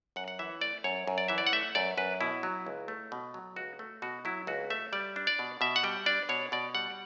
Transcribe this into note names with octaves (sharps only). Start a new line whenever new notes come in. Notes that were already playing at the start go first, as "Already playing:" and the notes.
F#2 F#5
F#5
E3 E5
A3 D5
F#2 C#5
F#2
D5
E3 E5
D5
F#5
A3 E5
F#2 D5
F#2 B4
B2 E4
F#3
C#2
A3
B2
F#3
C#2 F#4
A3
B2 F#4
F#3 E4
C#2 F#4
A3 E5
G3 D5
D4
D5
B2
B2 E5
F#5
G3 G5
D4 D5
B2 C#5
B2 D5
G3 F#5